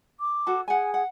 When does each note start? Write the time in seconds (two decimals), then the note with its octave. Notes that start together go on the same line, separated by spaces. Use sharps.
0.20 D6
0.46 F#4 A4 A5
0.68 G#4 F#5 G#5
0.94 F#5